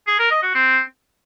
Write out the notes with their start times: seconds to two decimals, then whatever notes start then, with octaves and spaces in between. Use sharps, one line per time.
0.07 G#4
0.19 A#4
0.31 D#5
0.42 F#4
0.54 C4